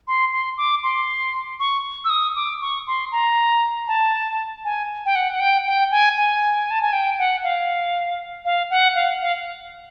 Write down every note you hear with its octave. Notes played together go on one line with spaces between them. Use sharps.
C6
C6
D6
C6
C#6
E6
D#6
D6
C#6
C6
A#5
A5
G#5
G5
F#5
F#5
G5
G5
G#5
G#5
A5
G#5
G5
F#5
F5
F5
F#5
F5
F5